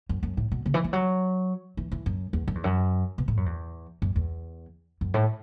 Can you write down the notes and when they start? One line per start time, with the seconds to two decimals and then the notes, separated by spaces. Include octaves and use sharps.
0.09 F#2
0.23 F#2
0.37 A2
0.52 B2
0.66 C#3
0.74 E3
0.84 E3
0.93 F#3
1.77 E3
1.92 E3
2.06 F#2
2.33 E2
2.48 F#2
2.55 E2
2.64 F#2
3.18 B2
3.28 A2
3.37 F#2
3.46 E2
4.02 F#2
4.16 E2
5.01 F#2
5.14 A2